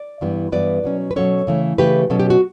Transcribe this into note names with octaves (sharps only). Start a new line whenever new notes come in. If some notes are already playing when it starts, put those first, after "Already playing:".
Already playing: D5
G2 E3 G3 B3
G2 E3 G3 B3 B4 D5
B2 F#3 C#4
B4
B2 F#3 C#4 A4 C#5
C#3 E3 A3
C#3 E3 A3 G4 B4
B2 F#3 C#4 A4
G4
F#4